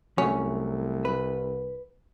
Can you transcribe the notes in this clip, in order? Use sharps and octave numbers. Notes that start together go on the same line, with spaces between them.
C2 F#3 A3 C#4
B4